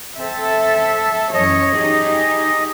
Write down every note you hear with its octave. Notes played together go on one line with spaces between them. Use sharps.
C4 A4 E5
F#2 E3 C#5 D#5
D#4 G4 G#4